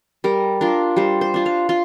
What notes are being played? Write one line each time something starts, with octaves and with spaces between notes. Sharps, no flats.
G3 A#4
D4 F4 A#4
G3 C5
C5
D4 F4
F5
F4